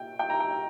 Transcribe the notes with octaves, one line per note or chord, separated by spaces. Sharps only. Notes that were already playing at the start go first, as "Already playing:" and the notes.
Already playing: A#2 G5
G5
A#5
G5